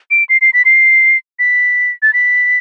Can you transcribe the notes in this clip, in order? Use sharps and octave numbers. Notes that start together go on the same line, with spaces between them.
D7
C7
C7
B6
C7
B6
A6
B6